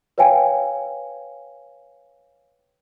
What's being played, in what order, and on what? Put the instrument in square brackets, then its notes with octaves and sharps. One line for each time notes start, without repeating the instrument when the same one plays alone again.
[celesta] B4 C#5 F5 G5 G#5